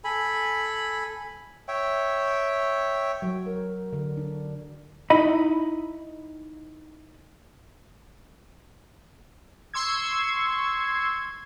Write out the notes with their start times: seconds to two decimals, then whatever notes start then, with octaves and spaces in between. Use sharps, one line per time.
0.04 A4 G#5 B5
1.68 C#5 E5 G5
3.22 F#3
3.46 A#4
3.93 D3
4.17 D4
5.10 D#4 E4 D#5 B5
9.74 C6 C#6 E6 G#6